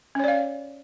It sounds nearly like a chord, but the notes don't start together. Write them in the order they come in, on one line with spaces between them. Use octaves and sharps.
C#4 C#5 D5 F5